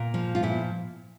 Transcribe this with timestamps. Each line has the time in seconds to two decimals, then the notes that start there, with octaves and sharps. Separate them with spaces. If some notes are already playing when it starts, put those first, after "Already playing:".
Already playing: A#2 F4
0.14 F3
0.35 F4
0.43 A#2 E4